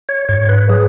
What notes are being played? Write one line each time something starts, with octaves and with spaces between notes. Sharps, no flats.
C#5
G#2 C#5
B4
F#3 G#4